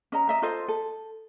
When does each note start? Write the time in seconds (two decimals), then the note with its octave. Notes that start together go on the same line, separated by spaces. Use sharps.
0.12 C#4 D#5 A#5
0.28 D#5 E5 A#5
0.42 F4 A4 C5 D#5
0.68 A4